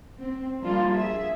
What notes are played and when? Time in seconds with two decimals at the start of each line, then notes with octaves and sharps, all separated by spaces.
0.19 C4
0.60 F3 G3 A#3 D4 E4 F4
0.91 G#4 E5